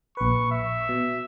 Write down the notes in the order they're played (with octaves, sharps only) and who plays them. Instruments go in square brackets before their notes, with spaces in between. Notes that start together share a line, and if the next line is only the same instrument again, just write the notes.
[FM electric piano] A#1 B4 [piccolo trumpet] C#6
[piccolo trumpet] E5
[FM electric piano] B2